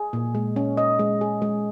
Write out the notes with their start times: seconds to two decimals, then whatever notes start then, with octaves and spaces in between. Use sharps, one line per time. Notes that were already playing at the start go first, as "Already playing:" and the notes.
Already playing: G#4
0.13 A#2
0.35 G#3
0.56 C#4
0.77 D#5
0.99 G#3
1.21 G#4
1.42 G#3